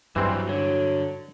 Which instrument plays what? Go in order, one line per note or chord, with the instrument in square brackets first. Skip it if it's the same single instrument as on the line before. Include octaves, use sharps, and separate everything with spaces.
[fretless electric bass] G2 [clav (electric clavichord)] E3 C4 [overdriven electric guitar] F#3 G3
[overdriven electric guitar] D3 [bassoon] F#3